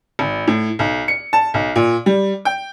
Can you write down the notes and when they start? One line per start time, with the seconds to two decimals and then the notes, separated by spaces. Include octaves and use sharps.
0.19 G#1
0.48 A2
0.79 B1
1.08 C#7
1.33 A5
1.54 B1
1.76 A#2
2.06 G3
2.45 G5